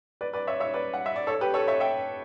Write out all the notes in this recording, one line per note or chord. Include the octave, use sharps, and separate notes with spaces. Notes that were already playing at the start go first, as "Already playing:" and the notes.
B4 D5
B4 D5
C#5 E5
C#5 E5
B4 D5
F#5
E5
D5
A4 C#5
G4 B4
A4 C#5
C#5 E5
E5 G5